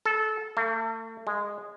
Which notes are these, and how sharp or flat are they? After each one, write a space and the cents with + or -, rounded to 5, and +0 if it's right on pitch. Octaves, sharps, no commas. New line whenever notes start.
A4 -20
A3 +40
G#3 -15